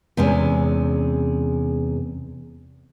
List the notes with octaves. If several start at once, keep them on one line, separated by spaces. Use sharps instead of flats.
E2 C3 G#3 C#4